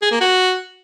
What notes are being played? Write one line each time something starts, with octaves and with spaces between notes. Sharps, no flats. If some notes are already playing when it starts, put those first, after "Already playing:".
G#4
A#3
F#4